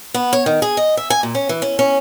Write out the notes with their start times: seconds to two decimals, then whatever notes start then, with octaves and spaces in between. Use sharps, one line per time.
0.14 B3
0.33 C#5
0.46 D#3
0.62 G#4
0.77 D#5
0.97 E5
1.10 G#5
1.23 A#2
1.35 C#4
1.49 E3
1.62 C#4
1.79 C#4